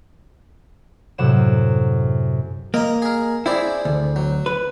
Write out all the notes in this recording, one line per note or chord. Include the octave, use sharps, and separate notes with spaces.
F#2 A2 C3 F#5 E7
A#3 D#5 A#5
G#4 A#4
C4 E4 G#4 D5
D2
F#3
B4